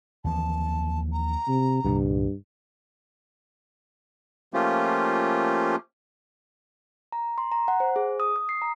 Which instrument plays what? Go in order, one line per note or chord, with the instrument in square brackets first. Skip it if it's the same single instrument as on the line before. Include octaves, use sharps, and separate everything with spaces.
[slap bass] D#2 E3 F3 [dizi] A5
[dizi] A#5
[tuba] C3
[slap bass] C2 A#2 D3 [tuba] G2
[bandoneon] F3 A3 A#3 C#4 F4 G4
[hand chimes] A#5
C6
A#5
F#5
C5
G#4
D#6
D#6
C7
A#5